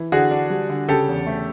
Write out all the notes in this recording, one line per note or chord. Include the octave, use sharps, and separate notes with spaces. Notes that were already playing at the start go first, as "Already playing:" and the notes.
Already playing: E3
D3 F#4 G#4
D4
G3
D3
C#3 G4 A4
E2
A3